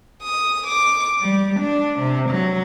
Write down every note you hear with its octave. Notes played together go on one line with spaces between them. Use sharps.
D#6
D6
G3
D4
C3
F#3